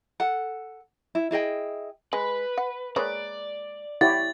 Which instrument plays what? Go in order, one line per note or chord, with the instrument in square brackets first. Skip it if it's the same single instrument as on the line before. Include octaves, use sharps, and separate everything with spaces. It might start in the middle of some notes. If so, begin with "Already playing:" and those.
[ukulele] A4 F#5
E4
E4 G#4 D#5 G5
[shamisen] G#3 [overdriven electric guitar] B4
[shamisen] F#5
[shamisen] G#3 A#3 C#5 [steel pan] B4 [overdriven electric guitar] D5
[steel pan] E4 G4 C#5 [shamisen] F#5 [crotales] A6